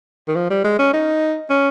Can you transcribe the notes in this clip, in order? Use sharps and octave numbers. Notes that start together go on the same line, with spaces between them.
D#3
F3
G3
G#3
C#4
D#4
C#4